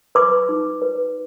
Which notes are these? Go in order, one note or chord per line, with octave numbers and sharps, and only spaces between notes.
B4 D6
D#4
B4